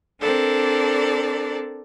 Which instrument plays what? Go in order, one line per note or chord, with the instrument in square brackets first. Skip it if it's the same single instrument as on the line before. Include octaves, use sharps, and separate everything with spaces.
[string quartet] C4 D4 A4 A#4 D5